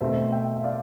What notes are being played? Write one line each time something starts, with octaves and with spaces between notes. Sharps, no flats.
B2 A3 C4 C5 E5
E5 G5
E5
D5 F5